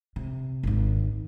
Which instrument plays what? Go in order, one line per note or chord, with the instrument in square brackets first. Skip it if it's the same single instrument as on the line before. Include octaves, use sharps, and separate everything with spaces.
[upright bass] C3
G#1 D#2